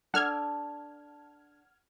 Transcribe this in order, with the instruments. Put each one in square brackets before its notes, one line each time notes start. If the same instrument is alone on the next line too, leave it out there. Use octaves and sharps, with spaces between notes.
[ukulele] D4 A4 A5 [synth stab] F#5 F6 G#6